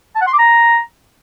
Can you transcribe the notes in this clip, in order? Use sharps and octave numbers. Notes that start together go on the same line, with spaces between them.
A5
F#5
C6
D6
A#5